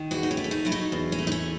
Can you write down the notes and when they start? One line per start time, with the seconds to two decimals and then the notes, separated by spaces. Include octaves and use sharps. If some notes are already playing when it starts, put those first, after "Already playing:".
Already playing: D#3
0.11 E2 F#4
0.23 D#4
0.31 C#4
0.37 A3
0.44 C#4
0.51 D#4
0.65 F#3 E4
0.72 D#4
0.92 E2
1.12 C#4
1.19 A3
1.27 D#4
1.32 C#4